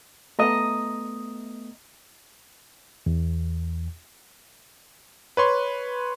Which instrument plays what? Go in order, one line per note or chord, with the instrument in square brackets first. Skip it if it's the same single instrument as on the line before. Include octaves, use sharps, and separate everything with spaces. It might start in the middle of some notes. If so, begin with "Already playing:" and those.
[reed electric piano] A3 B3 [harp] D#5 A#5
[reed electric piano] E2
[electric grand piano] B4 C#5 C6